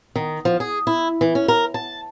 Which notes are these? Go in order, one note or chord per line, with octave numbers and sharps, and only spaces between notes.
D#3
F3
G#4
E4
E3
C#4
A#4
A5